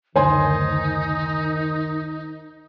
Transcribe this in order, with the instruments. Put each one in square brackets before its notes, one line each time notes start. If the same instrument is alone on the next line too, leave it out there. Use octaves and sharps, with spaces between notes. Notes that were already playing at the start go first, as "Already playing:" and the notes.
[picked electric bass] F#1 D2 [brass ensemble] D#3 [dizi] D#4 [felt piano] C5 G#5 C6